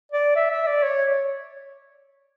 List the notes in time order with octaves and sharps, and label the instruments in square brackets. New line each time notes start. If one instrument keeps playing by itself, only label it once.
[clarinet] D5
E5
E5
D5
C#5